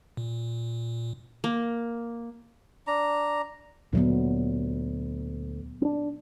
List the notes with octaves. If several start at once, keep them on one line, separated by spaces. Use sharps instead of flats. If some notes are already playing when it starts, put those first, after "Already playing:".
A#2
A#3
D4 A#5
D2 A#2 F#3 B3
C4 D4